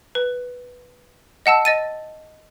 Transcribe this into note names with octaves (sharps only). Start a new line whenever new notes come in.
B4
D#5 F#5 A5 E6
D#5 A6 D#7